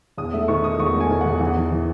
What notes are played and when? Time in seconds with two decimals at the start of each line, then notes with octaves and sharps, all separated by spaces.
0.17 E2 D#6
0.33 A3 E5
0.48 D#3 C#6
0.64 A3 D#6
0.80 E2 C#6
0.94 A3
1.00 G#5
1.10 D#3
1.21 F#5
1.26 E2
1.40 E3 F#5
1.56 E3
1.72 E3